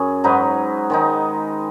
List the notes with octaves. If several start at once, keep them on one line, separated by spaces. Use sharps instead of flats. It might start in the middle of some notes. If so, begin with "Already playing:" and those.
Already playing: F#2 C#4 G#4
G#2 F#3 D#4 B4
D#3 G#3 D#4